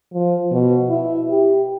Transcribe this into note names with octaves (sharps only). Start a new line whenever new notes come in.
F3
B2
E4
G4